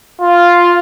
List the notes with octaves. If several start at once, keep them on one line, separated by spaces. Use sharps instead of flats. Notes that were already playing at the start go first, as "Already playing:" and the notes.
F4